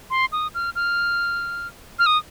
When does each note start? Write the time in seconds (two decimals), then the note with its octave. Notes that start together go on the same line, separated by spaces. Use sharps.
0.10 C6
0.32 D#6
0.55 F6
0.76 F6
1.99 F6
2.06 D#6